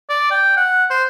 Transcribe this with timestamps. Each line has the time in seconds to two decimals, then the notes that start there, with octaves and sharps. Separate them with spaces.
0.10 D5
0.31 G5
0.57 F#5
0.90 C5